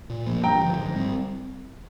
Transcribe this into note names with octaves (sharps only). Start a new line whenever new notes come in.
A#2
F3 A#3
G2 G5 A#5
D3 F3
G#2
G3 C4